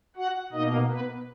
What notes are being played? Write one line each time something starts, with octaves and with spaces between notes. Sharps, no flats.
F#4 F#5
B2 A#3 D#4 D#5
B3 B4